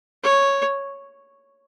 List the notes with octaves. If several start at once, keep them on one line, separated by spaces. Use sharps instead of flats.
C#5